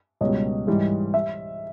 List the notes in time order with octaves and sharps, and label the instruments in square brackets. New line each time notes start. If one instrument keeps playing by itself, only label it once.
[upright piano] C#2 B2 G3 C#5 D#5
G#2 E3 G3
E5